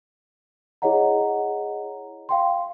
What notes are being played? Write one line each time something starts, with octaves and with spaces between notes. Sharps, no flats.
E4 G#4 C#5 D#5 F#5 A#5
F5 G5 C6